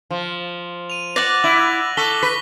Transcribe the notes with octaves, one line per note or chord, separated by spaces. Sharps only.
F3
D#7 F7
D5 F#5 D6 F#6 A#6
E4 F#7
A4 C#6 B6 G7
B4 B6